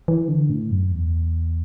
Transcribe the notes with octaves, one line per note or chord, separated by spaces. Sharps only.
E3
D3
A2
F#2
E2